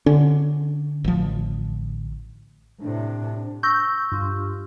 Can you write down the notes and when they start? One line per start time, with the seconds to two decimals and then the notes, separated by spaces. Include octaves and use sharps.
0.06 D3 C#4
1.04 A1 F3
2.81 A2 C3 D4
3.63 C#6 E6 G6 A#6
4.12 G2 F4